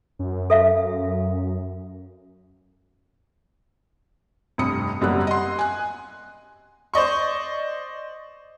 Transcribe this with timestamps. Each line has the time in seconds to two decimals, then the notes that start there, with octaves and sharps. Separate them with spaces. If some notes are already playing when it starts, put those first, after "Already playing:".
0.19 F#2
0.50 A4 E5 F5
4.58 F1 C2 G2 D#6 C#7
5.01 F#1 F#2 G3 A#3 B3 F#6
5.27 D#5 F#5 C6
5.59 G#5 F#6
6.94 C5 D5 D#5 C#6